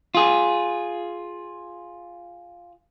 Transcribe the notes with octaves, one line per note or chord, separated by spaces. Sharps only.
F4 G#4